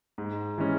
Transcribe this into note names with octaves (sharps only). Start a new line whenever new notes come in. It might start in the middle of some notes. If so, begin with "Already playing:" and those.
G#2
E3 G#3 C#4